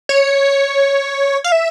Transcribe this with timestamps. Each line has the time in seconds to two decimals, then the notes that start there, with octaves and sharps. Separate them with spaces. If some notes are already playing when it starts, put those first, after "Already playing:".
0.09 C#5
1.44 F5
1.52 E5